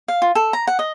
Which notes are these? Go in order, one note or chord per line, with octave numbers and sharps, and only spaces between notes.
F5
F4
A4
A#5
F#5
D#5